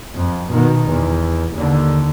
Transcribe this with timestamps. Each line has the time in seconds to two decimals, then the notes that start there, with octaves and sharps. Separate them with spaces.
0.15 F2
0.51 B2 D#3
0.90 E2
1.54 D#2 D3